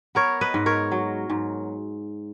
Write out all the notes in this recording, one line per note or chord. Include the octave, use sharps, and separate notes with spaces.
B3 A#4 C#5
B4 D#5
G#2
A#4 C#5
F#3
G#2